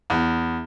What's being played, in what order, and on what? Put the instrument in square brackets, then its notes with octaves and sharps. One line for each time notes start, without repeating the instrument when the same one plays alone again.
[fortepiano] E2